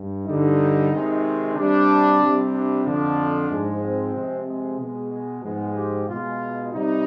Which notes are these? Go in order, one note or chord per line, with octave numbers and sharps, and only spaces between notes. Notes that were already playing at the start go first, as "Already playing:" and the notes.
Already playing: G2
G2 D3 G3 D#4
C3 D#3 G#3
C3 G3 D4
C3 G3
D4
F2 D3 F3 D4
G#2 F3 G#3
C4
C3 F3 G#3
G#3
B2 G#3
G#3
G#2 F3 G#3 B3
G4
B2 G#3 F4
C3 G3 D#4